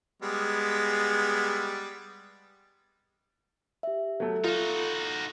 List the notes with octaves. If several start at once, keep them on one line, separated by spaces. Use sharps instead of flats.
G3 G#3 B3
G4 E5
F#3 A3 A4
D#4 F4 F#4